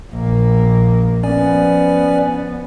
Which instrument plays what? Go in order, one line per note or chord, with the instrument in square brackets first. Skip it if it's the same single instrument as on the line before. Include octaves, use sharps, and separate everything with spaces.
[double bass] A#1 A#3
[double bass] F3 B3 [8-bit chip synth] C#4 D5 G#5